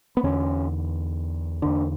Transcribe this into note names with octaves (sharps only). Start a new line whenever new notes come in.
B3
E2 D3 C#4
E2 D3 D4